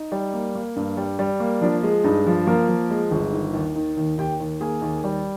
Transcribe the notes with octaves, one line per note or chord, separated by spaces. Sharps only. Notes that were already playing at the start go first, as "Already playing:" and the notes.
Already playing: D#4
G3
A#3
A#3
G2
G3
G3
A#3
F3 D4
G#3
G2 D#4
F3
F3 A#3 A#4
F3
G#3
G1
D#3
D#2
D#3
D#2
D#2 G4 G5
D#2
A#3 G#4 G#5
D#2
G3